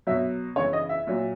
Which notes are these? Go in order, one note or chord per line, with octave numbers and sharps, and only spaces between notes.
B2 F#3 E5
C#3 E3 C#5
D#5
E5
A#2 F#3